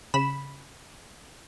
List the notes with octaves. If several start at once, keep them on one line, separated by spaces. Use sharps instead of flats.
C#3 B5 E7